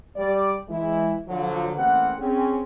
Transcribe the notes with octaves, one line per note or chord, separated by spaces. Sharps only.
G3 D5
E3 G#3 E4
D3 F3 F#3
A1 A#3 C4 B4 F#5
C4 C#4 G#4